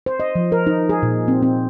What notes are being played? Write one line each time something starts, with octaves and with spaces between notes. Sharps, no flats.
C5
D#5
F3
A#4
D#4
G#4
A#2
C4
C4